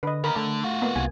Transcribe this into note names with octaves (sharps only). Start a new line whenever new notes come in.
D3 B4 D#5
D#2 D#3 A#4 B5
D3 A3
F4 F#4
A#3 B3
C2 G#5